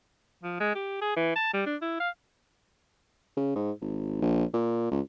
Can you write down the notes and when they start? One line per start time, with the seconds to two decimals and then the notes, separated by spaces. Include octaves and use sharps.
0.43 F3
0.60 G#3
0.75 G4
1.01 G#4
1.16 E3
1.36 A5
1.54 G3
1.66 D4
1.82 E4
2.00 F5
3.37 C#3
3.55 G#2
3.81 G#1
4.22 A#1
4.53 A#2
4.91 C#2